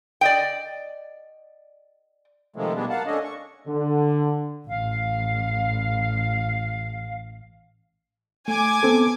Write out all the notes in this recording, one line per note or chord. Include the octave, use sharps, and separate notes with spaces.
D5 D#5 G5
C3 D#3 F3 G#3 A3
B2 G3 G#3 B3 D4
A#3 F5 F#5 A5
A3 C#4 D4 D#5
C#6
D3
A1 F5
A3 G#5 D6 G#6
B3 C4 A4